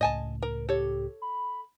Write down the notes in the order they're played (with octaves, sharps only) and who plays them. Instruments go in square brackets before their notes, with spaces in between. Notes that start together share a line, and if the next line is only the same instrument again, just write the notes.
[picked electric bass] C#2 A2 [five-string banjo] D#5 G#5 A5
[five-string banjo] A#4
[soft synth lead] G4 [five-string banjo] A4 C#5
[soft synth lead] B5